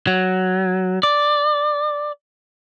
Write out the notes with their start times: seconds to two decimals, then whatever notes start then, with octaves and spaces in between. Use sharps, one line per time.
0.07 F#3
1.03 D5